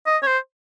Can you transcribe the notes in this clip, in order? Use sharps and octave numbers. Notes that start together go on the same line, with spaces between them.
D#5
C#5
C5